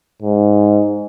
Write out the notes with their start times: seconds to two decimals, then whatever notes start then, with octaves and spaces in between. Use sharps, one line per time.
0.22 G#2